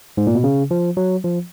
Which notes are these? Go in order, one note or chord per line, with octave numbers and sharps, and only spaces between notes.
G#2
A#2
B2
C#3
F3
F#3
F3